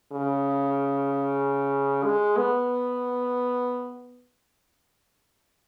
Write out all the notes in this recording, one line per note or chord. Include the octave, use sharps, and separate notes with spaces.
C#3
G#3
B3